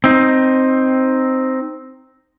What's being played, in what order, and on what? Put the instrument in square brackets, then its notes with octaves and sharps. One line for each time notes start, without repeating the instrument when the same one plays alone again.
[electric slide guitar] C4 D#4